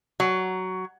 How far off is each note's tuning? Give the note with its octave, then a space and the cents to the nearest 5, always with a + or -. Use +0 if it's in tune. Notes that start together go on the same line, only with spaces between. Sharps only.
F#3 +10